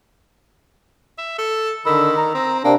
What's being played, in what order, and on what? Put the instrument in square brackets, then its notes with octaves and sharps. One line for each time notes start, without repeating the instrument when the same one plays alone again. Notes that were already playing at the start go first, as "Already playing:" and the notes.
[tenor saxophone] E5
A4
[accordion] D3 B5 E6 [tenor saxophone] D#3
[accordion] A#5
[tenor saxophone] C4
[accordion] C3 C4 D4 [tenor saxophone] A#3